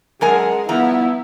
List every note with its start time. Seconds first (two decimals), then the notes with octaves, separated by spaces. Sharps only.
0.21 F#2 G#3 A#4 F#5 G#5
0.69 G2 F3 B3 E4 A#5